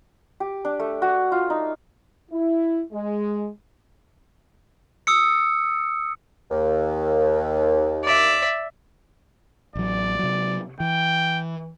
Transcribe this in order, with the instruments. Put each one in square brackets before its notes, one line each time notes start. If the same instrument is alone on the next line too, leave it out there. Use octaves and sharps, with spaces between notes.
[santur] G4
D4
A3
F#4
F4
D#4
[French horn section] E4
G#3
[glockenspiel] D#6 E6 C#7
[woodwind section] D#2
[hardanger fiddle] D5 E5
[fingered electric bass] A1 F#3 [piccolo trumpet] D5
[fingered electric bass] C3 F#3
[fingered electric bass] E3 [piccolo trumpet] G5